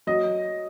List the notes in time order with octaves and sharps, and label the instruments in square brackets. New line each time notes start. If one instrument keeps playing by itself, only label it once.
[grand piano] F#3 D#5